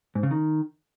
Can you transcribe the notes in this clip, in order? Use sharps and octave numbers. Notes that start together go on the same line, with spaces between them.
G#2
C#3
D#3